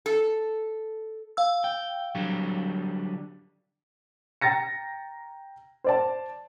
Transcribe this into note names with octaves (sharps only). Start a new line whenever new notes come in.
A4
F5 E6
G5
D3 F#3 G3
G5 A#5 A6 A#6 C#7
C5 D5 A5